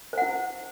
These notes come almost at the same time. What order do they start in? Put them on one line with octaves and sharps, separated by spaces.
C5 F#5 E4